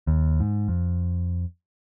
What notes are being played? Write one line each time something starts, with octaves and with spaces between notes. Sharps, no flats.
D#2
G#2
F2